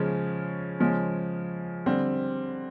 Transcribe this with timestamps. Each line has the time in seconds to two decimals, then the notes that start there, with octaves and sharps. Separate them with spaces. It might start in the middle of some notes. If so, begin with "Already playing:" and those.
Already playing: C#3 F3 G#3 C#4
0.80 C#3 F3 G#3
1.86 D3 G3 C4